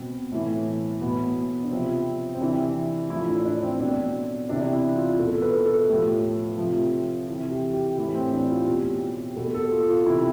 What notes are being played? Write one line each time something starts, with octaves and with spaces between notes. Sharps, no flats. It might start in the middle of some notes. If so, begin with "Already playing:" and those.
Already playing: B2 C4
A2 E3
B2 B3
D4
C3 F3 C4
C4
C3 E3 D4
A2 F3 E4
D4
D4
C4
B2 D4
C3 E3 D4
E4
F4
B2 A4
A4
B4
A4
A2 F3 G4
C3 F3
C3 E3
G4
G4
A2 E3 G4
C4
D4
F4
B2 G4
B2 A4
A4
F4
F4
C3 E3 E4